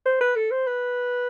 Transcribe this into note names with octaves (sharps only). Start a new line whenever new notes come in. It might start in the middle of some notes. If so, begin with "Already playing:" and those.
C5
B4
A4
C5
B4